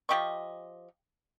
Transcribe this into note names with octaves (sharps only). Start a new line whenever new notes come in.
F3 G4 D#5 C#6